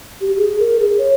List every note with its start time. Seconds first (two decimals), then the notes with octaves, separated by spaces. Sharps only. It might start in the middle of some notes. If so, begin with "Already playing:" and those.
0.21 G4
0.37 G#4
0.59 A#4
0.80 G#4
0.98 C#5